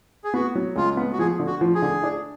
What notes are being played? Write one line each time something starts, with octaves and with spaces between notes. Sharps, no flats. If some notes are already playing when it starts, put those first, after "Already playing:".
G#4
B3 F#4
F#3
C#2 F4
B3
F#4
F3 G#4
D3
F#4
F3
G#4
D3
D4